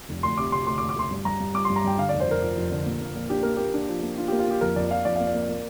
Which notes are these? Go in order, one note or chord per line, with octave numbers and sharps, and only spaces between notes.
F1
D2 C6
C3 D6
C3 C6
D2 C6
D6
D2
D6
D2 C6
G2
G2 A#5
G2
G3 D6
C6
G2
A#5
G2 G5
D3 F5
D5
F1
C5
F1 A#4
F3
F2
D3
A#2
A#3
A#1
D4 G4
A#3 A#4
A#3 G4
D4
F3
A#3
D4 F4
G4
A#3
F4
A#3 G4
F2 A#4
F2 D5
F3 F5
F2 D5
A#3 F5
D5
A#3
A#3